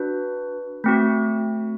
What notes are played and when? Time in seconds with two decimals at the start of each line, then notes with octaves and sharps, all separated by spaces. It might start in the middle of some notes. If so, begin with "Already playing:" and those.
Already playing: D4 F#4 B4
0.84 A3 C4 F#4